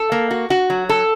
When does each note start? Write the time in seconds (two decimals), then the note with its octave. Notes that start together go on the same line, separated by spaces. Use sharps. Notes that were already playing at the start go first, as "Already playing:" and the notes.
Already playing: A4
0.12 A#3
0.31 F#4
0.50 F#4
0.70 F#3
0.89 A4